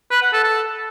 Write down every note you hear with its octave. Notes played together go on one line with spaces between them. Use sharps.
B4
F#5
A4
A4